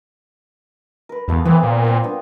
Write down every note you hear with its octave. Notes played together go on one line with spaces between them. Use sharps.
A#4 B4
E2 G#4 A4 F5
E3 B3 C4 A4
A#2 G#5
C4 F4
A#3 B3 D4